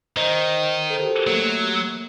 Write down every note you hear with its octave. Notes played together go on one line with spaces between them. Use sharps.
D#3 C5 D#5
A4 C5
G4 A#4
F#4 A4
G4
F#3 A#3
A3
A#3
A#3